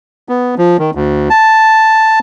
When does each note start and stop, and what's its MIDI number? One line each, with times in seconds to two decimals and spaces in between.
0.29 0.55 59
0.58 0.77 53
0.79 0.91 51
0.95 1.29 38
1.30 2.19 81